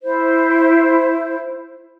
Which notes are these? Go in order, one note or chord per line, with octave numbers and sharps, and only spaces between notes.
E4 C5